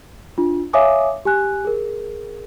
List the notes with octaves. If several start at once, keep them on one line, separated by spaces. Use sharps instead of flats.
D4 F4
C#5 E5 F5 G#5 D6 D#6
G4 G#5 F#6
G#4 A#4